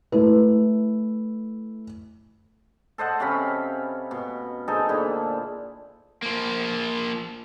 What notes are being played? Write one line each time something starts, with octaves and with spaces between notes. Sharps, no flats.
A3 E4 B4
A4 C5 D#5 F#5
C3 C#4 F5 B5
B2
D#4 G#4 A4 C5
A#2 D3 E4
F3 A#3